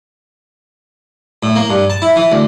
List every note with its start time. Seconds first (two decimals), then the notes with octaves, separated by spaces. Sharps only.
1.43 A2
1.56 A#3
1.70 G2
1.90 A5
2.02 E4
2.16 E3
2.32 D2